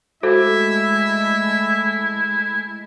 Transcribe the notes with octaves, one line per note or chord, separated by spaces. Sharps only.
G#3 A3 E4 F#4 A4 C5 E5